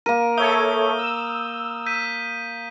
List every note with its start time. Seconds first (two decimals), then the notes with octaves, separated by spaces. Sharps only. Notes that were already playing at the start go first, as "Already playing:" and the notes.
0.06 A#3 A#4 D#7
0.37 A4 C#5 E5 D#6 G6 G7
0.98 E6
1.86 G6 B6 D#7